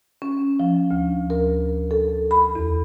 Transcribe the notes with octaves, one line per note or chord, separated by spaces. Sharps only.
C#4
F3
D2
A#4
A4
B5
E2